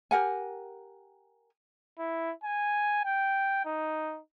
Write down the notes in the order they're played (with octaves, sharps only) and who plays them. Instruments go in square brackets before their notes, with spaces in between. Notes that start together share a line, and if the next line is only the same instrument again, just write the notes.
[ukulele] G4 A#4 F#5 G#5
[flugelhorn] E4
G#5
G5
D#4